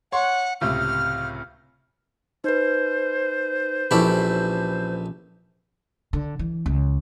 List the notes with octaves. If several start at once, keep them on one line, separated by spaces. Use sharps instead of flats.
C#5 F#5 C6
C#2 A2 C3 F6
D#4 B4 C5
A#1 E3 C#4 G4 A4 B4 B5
D3
E3
C#2